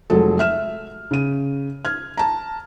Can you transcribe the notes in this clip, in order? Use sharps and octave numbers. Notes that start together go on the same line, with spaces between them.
F1 F#3 G#3 A4
E5 F6 E7
C#3 D#7
F6 G#6
A5 A#5